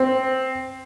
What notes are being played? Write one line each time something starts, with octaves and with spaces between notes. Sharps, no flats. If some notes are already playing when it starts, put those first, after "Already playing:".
Already playing: C4